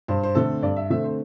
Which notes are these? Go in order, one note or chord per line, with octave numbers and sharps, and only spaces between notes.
G2 C5
C5
D3 A3 C4 A4
G2 D5
E5
D3 A3 C4 E5
C5